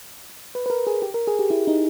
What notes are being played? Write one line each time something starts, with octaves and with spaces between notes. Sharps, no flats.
B4
B4
A#4
G#4
G4
A#4
G#4
G4
E4
D#4